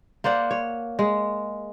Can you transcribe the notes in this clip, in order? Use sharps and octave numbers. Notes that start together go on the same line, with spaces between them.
A#3 C5 D5 F#5
C#5
G#3